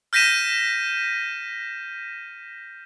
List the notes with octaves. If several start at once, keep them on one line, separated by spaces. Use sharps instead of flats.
F6 G6 A#6 B6 D#7 E7